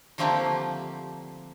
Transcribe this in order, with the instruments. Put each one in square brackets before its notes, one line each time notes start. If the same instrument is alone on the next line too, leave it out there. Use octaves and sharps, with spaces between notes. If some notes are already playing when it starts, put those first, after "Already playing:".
[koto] D3 F3 A3 A#3 C4 G4